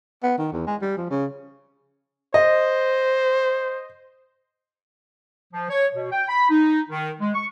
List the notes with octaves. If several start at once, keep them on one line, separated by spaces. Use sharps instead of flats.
B3
D#3
E2
G#3
G3
F3
C#3
C5 D#5
F3
C#5
B2
G5
B5
D#4
D#3
G#3
C#6